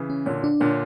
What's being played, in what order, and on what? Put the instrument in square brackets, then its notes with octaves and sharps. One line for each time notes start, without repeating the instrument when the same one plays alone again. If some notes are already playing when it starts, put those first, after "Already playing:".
Already playing: [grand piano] C#3 E3
[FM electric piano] C#4
[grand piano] A#2 D3 [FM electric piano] C#5
[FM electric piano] D4
[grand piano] A#2 D3 [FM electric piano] C#5